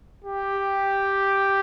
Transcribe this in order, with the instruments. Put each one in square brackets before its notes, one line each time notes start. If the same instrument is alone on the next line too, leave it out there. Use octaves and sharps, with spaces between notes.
[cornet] G4